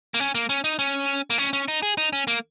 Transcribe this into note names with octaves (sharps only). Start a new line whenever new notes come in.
A#3
C#4
A#3
C#4
D#4
C#4
A#3
C#4
C#4
D#4
G#4
D#4
C#4
A#3